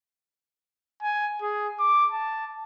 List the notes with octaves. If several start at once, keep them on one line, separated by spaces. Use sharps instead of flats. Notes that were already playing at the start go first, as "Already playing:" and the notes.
G#5
G#4
D6
A5